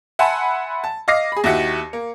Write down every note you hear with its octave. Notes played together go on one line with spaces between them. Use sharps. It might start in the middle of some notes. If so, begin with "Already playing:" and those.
E5 F#5 G#5 A5 B5 C6
A5
D#5 F5 D6 A#6 C7
G#4 B5
D#2 E4 F#4 G4 C#7
A#3